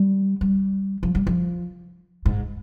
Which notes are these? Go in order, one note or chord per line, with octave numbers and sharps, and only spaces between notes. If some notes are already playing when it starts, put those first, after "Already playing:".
Already playing: G3
G3
F3
G3
F3
G#2